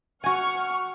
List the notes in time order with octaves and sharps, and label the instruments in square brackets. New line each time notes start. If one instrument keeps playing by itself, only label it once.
[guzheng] F#4 G#5 [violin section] F#5 C#6 F6